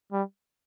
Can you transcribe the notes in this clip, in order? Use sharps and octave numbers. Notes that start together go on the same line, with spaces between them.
G3